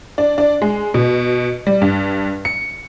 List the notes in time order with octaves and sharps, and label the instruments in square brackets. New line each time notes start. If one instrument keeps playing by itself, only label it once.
[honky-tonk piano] D4
D4
G#3
B2
G3
G2
C#7